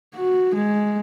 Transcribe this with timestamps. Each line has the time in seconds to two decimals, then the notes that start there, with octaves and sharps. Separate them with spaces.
0.15 F#4
0.55 G#3